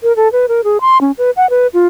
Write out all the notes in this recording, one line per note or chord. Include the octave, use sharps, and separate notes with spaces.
A#4
A4
B4
A#4
G#4
C6
C#4
B4
F#5
B4
F4